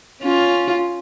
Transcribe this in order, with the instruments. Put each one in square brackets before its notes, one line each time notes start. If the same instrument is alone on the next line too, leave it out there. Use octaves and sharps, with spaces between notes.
[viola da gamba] C#4 F4